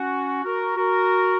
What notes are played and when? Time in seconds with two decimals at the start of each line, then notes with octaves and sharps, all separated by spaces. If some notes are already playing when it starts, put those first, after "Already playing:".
Already playing: C#4 F#4
0.44 F#4 A#4
0.76 F#4 A#4